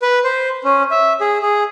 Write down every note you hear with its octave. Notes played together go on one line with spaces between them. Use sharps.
B4
C5
C#4
E5
G#4
G#4